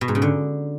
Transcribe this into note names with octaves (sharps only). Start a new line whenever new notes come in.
B2
G#2
C#3
D3